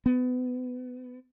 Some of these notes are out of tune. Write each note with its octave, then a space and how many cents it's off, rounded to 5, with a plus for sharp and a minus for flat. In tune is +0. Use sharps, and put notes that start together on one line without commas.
B3 +30